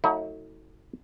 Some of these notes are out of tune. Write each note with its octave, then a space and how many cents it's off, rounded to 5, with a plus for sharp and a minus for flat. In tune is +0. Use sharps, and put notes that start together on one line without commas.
F#3 +0 A3 +30 D#4 +45